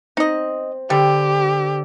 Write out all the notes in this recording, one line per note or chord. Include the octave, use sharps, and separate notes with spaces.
C4 D#4 D#5
D3 G3 G4